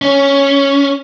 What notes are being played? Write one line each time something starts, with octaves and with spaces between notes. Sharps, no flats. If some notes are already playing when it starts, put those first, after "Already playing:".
C#4